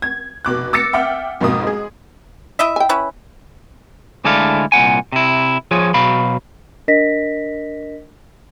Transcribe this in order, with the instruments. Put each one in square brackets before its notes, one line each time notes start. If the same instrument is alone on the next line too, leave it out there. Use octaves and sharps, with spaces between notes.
[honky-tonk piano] G#6
F1 B2 D6 F#6
D6 E6 A6 A#6 C#7
E5 F#5 G5 D6 F6
B1 F2 G#2 B2 A#3 D#6
G#3 G#4
[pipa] E4 D#5 E5
[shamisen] G5 G#5
[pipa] C#4 E4 B4
[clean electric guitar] D2 G#3 D4 E4 A4 F5
C2 A#2 F#5 G#5
C3 E4
F3 F4 G#4 C#5
B2 F#3 F5 B5
[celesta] D4 A#4 D#5 A#6 B6